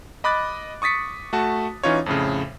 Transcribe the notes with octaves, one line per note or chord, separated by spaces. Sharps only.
D#5 B5 D6 F#6 A6
C#6 D#6 A6 B6 C#7
A3 F#4 A5
E3 C#4 D#4 F4 C#5
F2 A2 C#3